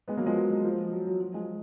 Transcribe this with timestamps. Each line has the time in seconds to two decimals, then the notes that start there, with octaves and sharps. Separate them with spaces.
0.08 G#3 B3
0.17 F#3 A#3
0.26 F3 G#3
0.36 F#3
0.64 F3
0.92 F#3
1.07 F#3
1.20 F#3
1.34 F3 G#3